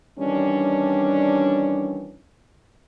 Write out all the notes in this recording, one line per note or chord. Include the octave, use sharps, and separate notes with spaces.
D#3 E3 G3 C#4 D4